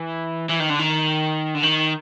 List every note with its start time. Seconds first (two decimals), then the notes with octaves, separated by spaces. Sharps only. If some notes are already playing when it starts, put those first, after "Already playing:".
Already playing: E3
0.49 E3
0.60 D#3
0.69 D3
0.79 D#3
1.55 D3
1.63 D#3